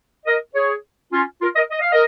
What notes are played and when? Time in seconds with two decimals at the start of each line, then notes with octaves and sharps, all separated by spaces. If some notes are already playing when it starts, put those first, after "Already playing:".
0.26 A#4 D#5
0.55 G#4 C#5
1.12 C#4 F4
1.42 F4 A#4
1.56 A#4 D#5
1.71 D#5
1.81 F5
1.92 A#4 D#5